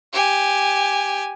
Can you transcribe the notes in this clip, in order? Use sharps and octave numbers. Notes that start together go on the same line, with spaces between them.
G4 G#5